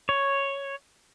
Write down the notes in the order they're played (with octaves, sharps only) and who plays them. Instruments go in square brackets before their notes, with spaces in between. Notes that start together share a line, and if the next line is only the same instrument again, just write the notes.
[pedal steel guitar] C#5